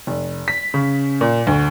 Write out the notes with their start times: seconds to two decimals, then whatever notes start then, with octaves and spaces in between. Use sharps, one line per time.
0.07 F1
0.48 B6
0.74 C#3
1.21 A#2
1.47 D2